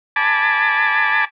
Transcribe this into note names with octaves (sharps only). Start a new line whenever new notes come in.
G#5 A5 B5 D6